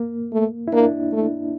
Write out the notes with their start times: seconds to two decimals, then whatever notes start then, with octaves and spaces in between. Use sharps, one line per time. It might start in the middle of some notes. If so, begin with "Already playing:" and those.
Already playing: A#3
0.33 A3
0.68 E4
0.73 A#3 D4
1.13 A3